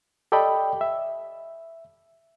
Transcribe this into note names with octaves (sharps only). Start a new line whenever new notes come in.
G4 A4 D5 D#5 G5 B5
E5